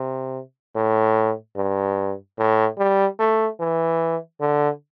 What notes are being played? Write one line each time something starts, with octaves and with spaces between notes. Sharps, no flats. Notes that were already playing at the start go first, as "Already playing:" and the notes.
Already playing: C3
A2
G2
A2
G3
A3
E3
D3